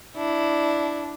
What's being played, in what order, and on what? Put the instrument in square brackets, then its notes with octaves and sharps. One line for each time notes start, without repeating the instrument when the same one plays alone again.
[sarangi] D4 [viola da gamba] E4